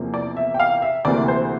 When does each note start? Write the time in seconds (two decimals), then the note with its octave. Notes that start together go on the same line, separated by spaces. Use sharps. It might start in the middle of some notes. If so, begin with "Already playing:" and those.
Already playing: E2 C3 F3 A#3
0.14 D5
0.37 E5
0.54 G5
0.60 F5
0.82 E5
1.05 D2 C3 E3 A#3 D5
1.28 C5